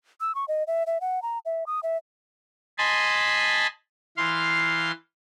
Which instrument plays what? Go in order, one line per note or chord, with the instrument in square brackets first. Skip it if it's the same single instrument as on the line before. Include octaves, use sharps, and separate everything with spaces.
[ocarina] E6
C#6
D#5
E5
E5
F#5
A#5
E5
D#6
E5
[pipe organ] D#5 G#5 A5 B5 C6
E3 F5 C6